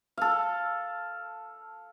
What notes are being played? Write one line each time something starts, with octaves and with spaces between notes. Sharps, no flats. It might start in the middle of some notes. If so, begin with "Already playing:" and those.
A4 F5